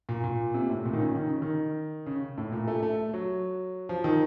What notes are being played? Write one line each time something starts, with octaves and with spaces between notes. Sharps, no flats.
A#2
A#2
C3
A2
A#2
D#3
C#3
D#3
C#3
D#3
C#3
A2
A#2
A3
A3
F#3
F3
D#3